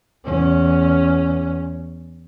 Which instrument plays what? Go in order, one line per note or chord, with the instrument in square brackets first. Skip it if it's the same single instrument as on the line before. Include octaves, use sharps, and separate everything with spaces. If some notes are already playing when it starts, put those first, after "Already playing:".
[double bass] E2 C#4